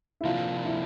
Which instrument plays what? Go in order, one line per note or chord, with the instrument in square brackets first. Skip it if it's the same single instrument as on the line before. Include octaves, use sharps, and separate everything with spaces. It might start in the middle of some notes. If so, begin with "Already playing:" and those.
[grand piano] E4
[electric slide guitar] C3 F3 A#3 D4 [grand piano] F4
[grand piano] E4